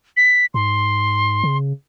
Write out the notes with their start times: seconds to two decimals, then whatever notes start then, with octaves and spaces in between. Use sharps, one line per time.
0.17 B6
0.54 G#2 C6
1.44 C#3